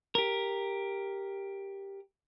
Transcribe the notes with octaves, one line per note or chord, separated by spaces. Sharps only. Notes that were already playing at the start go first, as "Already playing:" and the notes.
G4 A#4